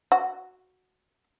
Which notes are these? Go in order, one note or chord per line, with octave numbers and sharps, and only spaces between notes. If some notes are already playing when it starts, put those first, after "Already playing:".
F#4